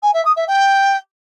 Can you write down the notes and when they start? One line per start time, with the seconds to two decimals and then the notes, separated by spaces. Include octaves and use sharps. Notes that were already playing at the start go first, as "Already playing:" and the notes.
0.03 G#5
0.14 E5
0.25 D#6
0.36 E5
0.48 G5